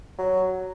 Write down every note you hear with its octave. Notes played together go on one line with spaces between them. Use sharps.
F#3